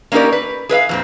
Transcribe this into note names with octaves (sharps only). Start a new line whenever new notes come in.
A#3 C#4 D#4 G4 A#4 D5
B4
G#4 B4 D#5 F5
F2 A#2 C4